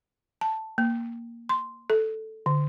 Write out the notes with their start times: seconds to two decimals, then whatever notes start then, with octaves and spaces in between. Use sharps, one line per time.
0.41 A5
0.78 A#3
1.49 C6
1.90 A4
2.46 D3